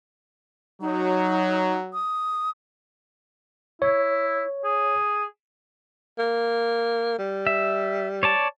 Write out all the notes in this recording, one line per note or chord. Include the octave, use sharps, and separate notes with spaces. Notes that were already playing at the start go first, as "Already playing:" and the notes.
F#3 D#4
D#6
E4 C#5
G#4
A#3
G3
E5
C#5 D5 A5